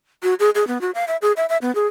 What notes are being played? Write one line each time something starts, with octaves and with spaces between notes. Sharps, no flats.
F#4
G#4
G#4
B3
F#4
F5
E5
G#4
E5
E5
B3
G#4